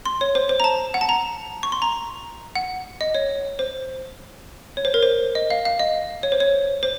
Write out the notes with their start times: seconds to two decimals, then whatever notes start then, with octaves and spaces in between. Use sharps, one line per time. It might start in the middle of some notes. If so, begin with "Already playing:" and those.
0.05 C6
0.21 C#5
0.35 C5
0.49 C5
0.60 A#5
0.64 A5
0.94 F#5
1.01 A5
1.09 A#5
1.63 C#6
1.72 C6
1.82 A#5
2.56 F#5
3.01 D#5
3.15 C#5
3.59 C5
4.77 C#5
4.85 C5
4.94 A#4
5.03 C5
5.35 D#5
5.51 F5
5.65 F5
5.79 D#5
6.23 C#5
6.32 C5
6.40 C#5
6.83 C5